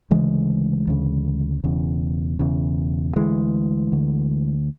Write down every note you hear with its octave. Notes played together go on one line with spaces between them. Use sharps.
D2 C#3 E3 G#3
D2 C#3
E1 E2 C#3
E1 E2 C#3
D2 D3 E3 G#3
D2 D3